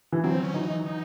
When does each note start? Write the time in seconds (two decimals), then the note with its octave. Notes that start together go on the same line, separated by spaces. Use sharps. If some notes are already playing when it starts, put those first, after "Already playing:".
0.12 E3
0.24 F#3 C4
0.43 C#4
0.54 E3 D#4
0.86 D#4